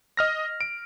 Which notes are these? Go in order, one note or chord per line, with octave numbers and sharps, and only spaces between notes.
D#5 F6 A#6
D7